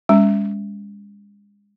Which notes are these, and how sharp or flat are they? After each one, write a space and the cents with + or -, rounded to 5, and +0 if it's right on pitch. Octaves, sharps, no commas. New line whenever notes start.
G#3 -35 C#4 +15